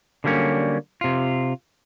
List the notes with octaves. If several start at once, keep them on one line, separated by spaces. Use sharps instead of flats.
D3 F#3 G3 A#3 C#4
C3 F4